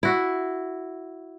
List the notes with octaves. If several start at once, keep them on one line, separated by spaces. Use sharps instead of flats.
E4 F#4